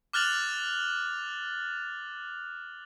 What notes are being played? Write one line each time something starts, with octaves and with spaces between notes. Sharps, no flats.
D6 F6 F#6 A6 F7 F#7